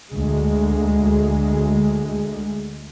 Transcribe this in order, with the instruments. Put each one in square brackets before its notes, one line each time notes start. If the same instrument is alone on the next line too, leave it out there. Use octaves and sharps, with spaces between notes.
[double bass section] D2 G#3